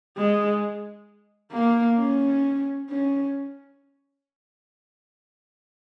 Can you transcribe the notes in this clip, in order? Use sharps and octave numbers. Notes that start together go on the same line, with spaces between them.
G#3
A#3
C#4
C#4